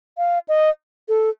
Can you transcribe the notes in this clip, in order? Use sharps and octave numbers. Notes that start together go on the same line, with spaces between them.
F5
D#5
A4